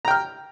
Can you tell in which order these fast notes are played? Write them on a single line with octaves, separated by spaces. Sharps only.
A#5 G5 F6